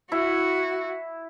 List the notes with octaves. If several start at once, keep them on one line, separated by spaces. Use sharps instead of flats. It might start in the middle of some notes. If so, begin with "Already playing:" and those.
E4 F#4